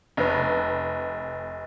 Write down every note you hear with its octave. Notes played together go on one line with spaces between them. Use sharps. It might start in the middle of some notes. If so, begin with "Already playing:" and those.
F1 B4